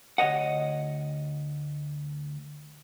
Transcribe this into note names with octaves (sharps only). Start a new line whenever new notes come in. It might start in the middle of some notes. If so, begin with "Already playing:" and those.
D2 C#5 D#5 F#5